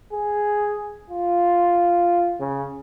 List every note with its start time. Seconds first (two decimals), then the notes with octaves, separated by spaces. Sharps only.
0.12 G#4
1.10 F4
2.40 C#3